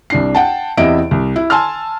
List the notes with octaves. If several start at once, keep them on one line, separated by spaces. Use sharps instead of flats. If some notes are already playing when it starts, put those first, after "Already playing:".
C2 D4 C7
F#5 G5 A5
E2 C3 E4 D#5 E5 D7
C2
E4
G#5 A5 C6 E6 F6